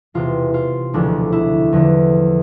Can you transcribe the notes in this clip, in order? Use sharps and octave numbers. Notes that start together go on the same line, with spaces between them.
E1 E2 C3 F4
F4
E1 D2 D3 F3 D4
E4
E2 D3 F3